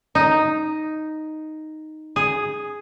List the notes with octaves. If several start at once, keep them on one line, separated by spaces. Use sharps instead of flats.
D#4
G#4